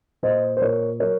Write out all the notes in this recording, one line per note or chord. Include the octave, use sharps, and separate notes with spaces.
A#2 C5 D#5
C5
A#2 A#4 C#5
F#3 A#4 C#5